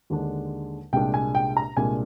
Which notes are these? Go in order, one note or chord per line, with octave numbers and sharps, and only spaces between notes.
D#2 D3 G#3 D4
C2 A#2 G#3 D4 G5
G#5
G5
A#5
C2 A#2 G#3 D4 G#5